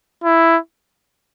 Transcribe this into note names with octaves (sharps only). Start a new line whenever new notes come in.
E4